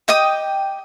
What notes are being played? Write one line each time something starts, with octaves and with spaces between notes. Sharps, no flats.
G4 D#5 G5 D#6